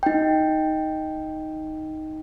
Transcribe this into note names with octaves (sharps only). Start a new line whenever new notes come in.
D#4 G5